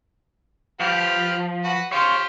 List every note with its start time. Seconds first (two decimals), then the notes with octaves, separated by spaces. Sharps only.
0.80 F3 G4 B4 F6
1.64 F#4 B4
1.92 F4 G4 C5 C#5 F5